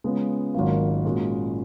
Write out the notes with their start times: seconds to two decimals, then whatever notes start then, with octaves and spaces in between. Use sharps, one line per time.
0.04 C#3 G#3 B3 F4
0.54 G#1 G#2 F#3 A#3 F4
1.05 A#2 G#3 C#4 F#4